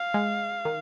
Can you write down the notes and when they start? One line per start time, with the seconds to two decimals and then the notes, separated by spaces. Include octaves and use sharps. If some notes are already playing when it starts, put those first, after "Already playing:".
Already playing: F5
0.14 G#3
0.65 D#3